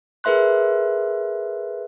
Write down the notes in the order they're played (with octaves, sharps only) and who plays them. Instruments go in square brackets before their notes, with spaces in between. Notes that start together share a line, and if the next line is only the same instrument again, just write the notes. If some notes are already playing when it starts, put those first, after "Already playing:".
[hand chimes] G#4 A#4 B4 E5 C6 F#6